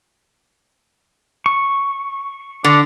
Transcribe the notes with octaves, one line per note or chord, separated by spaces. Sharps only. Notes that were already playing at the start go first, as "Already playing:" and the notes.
C#6
D3 D4